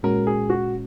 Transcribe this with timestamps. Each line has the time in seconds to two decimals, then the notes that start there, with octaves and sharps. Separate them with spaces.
0.03 A#2 G#3 C#4 F#4 A#4
0.27 G#4
0.50 F#4